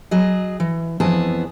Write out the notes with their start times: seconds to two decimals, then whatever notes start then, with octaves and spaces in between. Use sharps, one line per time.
0.11 F#3 G#4 D#5
0.60 E3
1.00 F2 E3 B3 G#4 A5